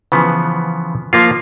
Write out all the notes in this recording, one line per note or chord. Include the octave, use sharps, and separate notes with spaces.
C#3 E3 F3 B3
F3 A#3 F4